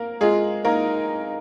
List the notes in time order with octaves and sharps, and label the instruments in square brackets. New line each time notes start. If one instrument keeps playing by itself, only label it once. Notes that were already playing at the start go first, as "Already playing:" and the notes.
Already playing: [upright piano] A#3 A#4
[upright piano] G#3 G#4 [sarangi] F4
[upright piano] A#3 A#4 [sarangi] D#4